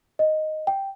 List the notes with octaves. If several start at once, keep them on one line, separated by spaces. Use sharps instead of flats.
D#5
G5